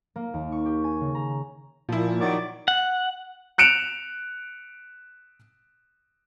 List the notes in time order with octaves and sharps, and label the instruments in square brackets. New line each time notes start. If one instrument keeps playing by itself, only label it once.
[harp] A#3
D#2
C#6
G4
G#5
C#3
A#5
[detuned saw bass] A#2 [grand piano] F3 E4
[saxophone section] D#3 F#3 D5
[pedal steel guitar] F#5
[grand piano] F#6 C#7 D7 E7 F7